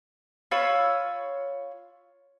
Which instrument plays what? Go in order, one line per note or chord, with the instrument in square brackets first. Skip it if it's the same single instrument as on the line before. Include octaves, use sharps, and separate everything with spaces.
[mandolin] F4 C#5 B5 E6